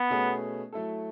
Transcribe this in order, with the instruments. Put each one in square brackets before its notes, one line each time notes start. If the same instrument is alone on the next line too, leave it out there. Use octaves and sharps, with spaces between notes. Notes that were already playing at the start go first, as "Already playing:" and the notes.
Already playing: [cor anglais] B3
[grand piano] B2 A3 C#4 G#4 B4
F#3 A3 E4 A4